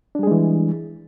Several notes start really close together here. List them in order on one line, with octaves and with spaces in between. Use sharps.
D4 G3 G#4 G#3 E3